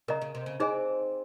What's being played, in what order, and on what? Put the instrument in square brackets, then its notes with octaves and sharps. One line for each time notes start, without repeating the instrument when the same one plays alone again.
[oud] C#3 [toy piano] A#4 D#5 A#5
[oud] C#3
C3
C#3
[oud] C4 [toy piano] D#4 G#4 C5 D#5 G#5